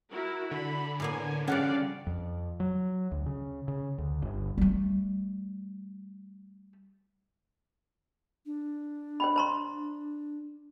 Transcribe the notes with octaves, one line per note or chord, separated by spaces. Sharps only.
E4 F#4 A#4
D3 B5
A2 A#3 B3 G#5
C#3 F3 G3 C#4 D5 F5 F#5
F2
F#3
D2
C#3
C#3
D2
G1
G3 A3
D4
C5 G5 B5
C5 A#5 C6